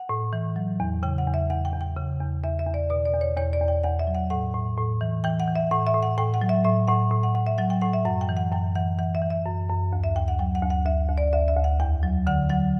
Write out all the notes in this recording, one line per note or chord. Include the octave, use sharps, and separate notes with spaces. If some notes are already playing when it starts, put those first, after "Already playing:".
Already playing: F#5
A2
E3
F#3
E2
C#3 G5
F#5
E2
E5
E2 F#5
G5
E2
G5
C#3
E2
E2 E5
E5
E2
D5
B2 D5
D5
E2
C#5
E2 C#5
D5
E2
G5
E2 F#5
E5
F#3
F#5
A2 F#5
A2
A2
E3
E3 G5
F#5
E3
E5
A2 F#5
E5
A2
F#5
A2 G5
F#5
F#3
E5
A2 E5
A2 F#5
A2
F#5
A2 F#5
E5
F#3 F#5
G5
A2 F#5
E5
F#2 F#5
G5
E3
F#5
F#2 G5
E3 F#5
E3 F#5
E5
E3
E5
F#2
F#2
D2
E5
D2 G5
F#5
F#3 G5
F#5
D2
F#5
D2 E5
D2
D5
D2 E5
E5
D2
F#5
E2 G5
F#3
D3 F#5
F#3 F#5